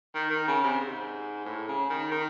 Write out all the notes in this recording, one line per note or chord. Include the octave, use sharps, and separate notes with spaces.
D#3
D#3
C#3
C3
G#2
A2
C#3
D#3
D#3